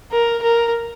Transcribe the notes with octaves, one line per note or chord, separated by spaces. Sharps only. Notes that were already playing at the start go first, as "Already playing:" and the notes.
A#4
A#4